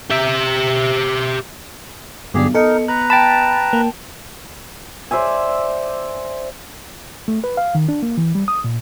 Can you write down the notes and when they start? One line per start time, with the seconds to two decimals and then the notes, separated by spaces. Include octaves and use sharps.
0.10 G4 E5
2.34 B1 G2 D3 D4 G4 G#4
2.55 B3 D#4 A4 A#4 D#5 C#7
2.88 B4 A#5 F#6
3.10 G5 A5 B5 A6
3.73 A#3
5.11 C5 D5 E5 G#5
7.28 A3
7.44 B4
7.57 F5
7.75 D#3
7.88 D4
8.03 A#3
8.17 E3
8.35 G3
8.48 D#6
8.64 A#2